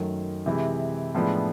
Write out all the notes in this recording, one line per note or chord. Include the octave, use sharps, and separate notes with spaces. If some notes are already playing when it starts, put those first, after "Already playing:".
Already playing: F#2 D#3 F#3 A3
C3 E3 G#3
A2 F3 G#3 B3 D4